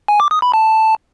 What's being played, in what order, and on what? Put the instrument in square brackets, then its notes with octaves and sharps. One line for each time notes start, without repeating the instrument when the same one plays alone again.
[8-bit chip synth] G#5
D6
D#6
B5
A5